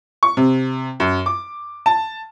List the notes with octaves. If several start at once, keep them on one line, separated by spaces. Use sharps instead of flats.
C#6
C3
F#2
D6
A5